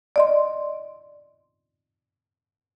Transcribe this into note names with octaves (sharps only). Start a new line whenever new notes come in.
D5 D#5 C6